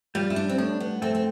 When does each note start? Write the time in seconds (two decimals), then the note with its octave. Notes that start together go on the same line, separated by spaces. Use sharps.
0.15 G3 F4
0.30 E4
0.36 D4
0.49 C4
0.58 A2 D4
0.80 B3
1.02 A3 C4
1.15 C4